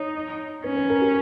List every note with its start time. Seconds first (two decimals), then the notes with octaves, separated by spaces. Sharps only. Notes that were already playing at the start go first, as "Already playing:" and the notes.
Already playing: D#4 C#5
0.64 C#4 B4
0.77 B4
0.89 A#4
1.02 G4